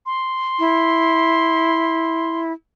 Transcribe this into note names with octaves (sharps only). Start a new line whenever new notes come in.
C6
E4